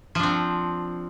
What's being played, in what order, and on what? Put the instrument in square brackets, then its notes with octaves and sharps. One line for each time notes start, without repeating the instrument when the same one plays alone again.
[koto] F3
D4
C4